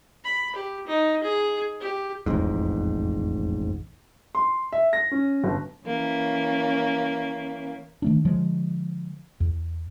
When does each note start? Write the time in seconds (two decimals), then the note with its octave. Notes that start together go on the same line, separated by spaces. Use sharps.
0.24 B5
0.56 G4
0.87 D#4
1.24 G#4
1.80 G4
2.26 E1 A1 F2 G#2
4.35 C6
4.73 E5
4.93 A#6
5.11 C#4
5.44 G1
5.86 E3 A#3 C#4
8.02 D#3 A3 D4
8.25 D3 F3 G#3
9.40 E2